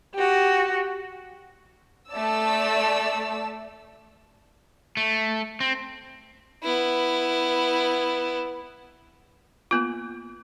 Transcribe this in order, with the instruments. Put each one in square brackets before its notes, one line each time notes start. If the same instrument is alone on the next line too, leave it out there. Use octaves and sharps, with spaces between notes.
[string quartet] F#4 G4
[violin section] A3 D5 A5 E6
[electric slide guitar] A3
C4
[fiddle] B3 E4
[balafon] A#3 B3 F4